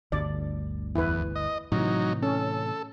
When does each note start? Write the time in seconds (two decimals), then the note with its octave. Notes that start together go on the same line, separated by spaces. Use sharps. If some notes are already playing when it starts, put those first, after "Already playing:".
0.12 G1 D2 D5
0.95 E2 E4 B4
1.36 D#5
1.72 A2 C3 E3 F#3 D#4
2.23 C#4 A4